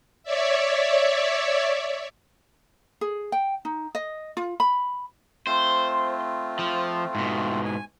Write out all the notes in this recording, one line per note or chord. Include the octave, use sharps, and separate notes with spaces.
C#5 D5 E5
G#4
G5
D#4
D#5
F4
B5
A3 C4 F4 C5
F3
G#2 B2
G#5